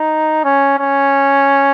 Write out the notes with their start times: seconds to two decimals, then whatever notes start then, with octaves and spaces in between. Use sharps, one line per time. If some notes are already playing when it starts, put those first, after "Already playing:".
Already playing: D#4
0.44 C#4
0.79 C#4